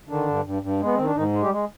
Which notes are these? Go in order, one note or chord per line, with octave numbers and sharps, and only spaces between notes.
D3 D#3 D4
G2
G2
G2
G#3 B3
D#3 C4
D4
G#2 D#3 D#4
G#3
G3 G4
G#3